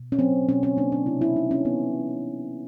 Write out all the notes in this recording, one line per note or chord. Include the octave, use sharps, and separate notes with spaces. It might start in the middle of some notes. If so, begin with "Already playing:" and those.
Already playing: B2
C#4
F#3 C4
B2 C#4
C#4
A#3 D4
D4
C3 E4
E4
G3 D#4
C#4
E3 B3